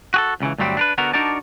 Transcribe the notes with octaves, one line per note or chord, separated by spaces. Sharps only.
F#4 G#4 A4
C#2 C#3 E3
D2 G2 F#3 G3 C4
D4 A#4 B4
D3 B3 F#4 A#4
D4 D#4 F#4 A#4 D5 A5